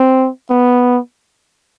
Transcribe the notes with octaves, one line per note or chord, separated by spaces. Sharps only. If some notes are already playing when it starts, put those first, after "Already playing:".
Already playing: C4
B3